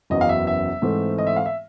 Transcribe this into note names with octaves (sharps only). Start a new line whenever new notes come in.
F#1 E2 C#3 F#3 B3 D#5
F5
E5
E5
G#2 E3 A3 C4
D#5
E5
F5
E5